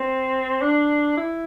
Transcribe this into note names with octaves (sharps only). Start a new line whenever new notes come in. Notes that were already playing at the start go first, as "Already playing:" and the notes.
Already playing: C4
D4
E4